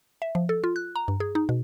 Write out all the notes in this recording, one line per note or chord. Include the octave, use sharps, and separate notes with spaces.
E5
F3
A4
F4
F#6
A#5
G2
G#4
D#4
B2